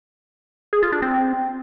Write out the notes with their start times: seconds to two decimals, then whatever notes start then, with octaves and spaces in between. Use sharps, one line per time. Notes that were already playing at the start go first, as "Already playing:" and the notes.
0.73 G#4
0.83 F4
0.92 D4
1.02 C4